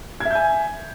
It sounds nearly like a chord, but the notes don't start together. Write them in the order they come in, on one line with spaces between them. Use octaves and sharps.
G#6 E5 G6 G#5